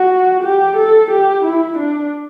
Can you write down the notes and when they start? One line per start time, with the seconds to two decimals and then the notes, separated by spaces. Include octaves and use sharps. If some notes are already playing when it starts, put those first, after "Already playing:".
Already playing: F#4
0.43 G4
0.77 A4
1.11 G4
1.45 E4
1.78 D4